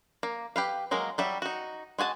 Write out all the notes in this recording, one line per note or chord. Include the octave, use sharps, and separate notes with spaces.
A#3
G4 B4 F5
F#3 G#3 A#3 A#4
F#3 G3 E5
D#4 F#4
G#3 F#4 G#5 A5